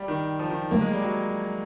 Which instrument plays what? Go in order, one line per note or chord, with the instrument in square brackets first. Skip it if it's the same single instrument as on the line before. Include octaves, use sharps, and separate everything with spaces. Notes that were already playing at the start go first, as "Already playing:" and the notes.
Already playing: [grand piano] G3
D#3
F3
D#3
[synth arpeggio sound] D3 F#3 A3 [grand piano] A#3
[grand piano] G#3
G3
F#3